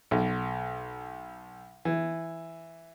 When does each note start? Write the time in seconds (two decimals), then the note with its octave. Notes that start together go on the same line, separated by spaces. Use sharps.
0.11 B1
1.85 E3